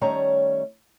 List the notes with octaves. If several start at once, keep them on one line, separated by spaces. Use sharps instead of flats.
D#3 G3 A3 C#4 C#5 A#5